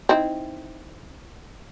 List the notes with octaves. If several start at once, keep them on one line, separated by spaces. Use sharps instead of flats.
C4 D#4 E4